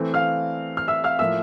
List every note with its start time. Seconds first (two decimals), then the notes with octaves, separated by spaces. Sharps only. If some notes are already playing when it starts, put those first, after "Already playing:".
Already playing: E3 A3 C4
0.14 F5 F6
0.77 F6
0.88 E5 E6
1.04 F5 F6
1.19 A2 F3 A#3 E5 E6